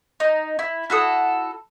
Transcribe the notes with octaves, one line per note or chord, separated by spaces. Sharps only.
D#4
E4
E4 F#4 A4 D#6